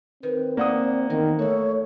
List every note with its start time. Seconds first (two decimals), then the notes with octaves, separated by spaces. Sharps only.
0.23 D#3 C4 B4
0.57 A#3 D5 F#5 D#6
1.10 E2 D#3 B3 A#4
1.39 A3 F#4 A4 C#5